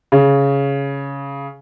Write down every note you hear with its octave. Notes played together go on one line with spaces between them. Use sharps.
C#3